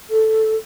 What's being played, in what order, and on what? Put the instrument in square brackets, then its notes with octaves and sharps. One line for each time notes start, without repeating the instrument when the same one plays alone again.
[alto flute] A4